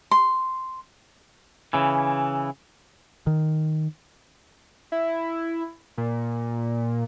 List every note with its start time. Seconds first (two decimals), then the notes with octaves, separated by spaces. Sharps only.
0.11 C6
1.73 C#3 E3
3.27 D#3
4.92 E4
5.98 A#2